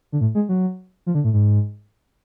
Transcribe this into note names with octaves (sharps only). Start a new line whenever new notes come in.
D3
A2
G#3
F#3
F3
D3
A2
G#2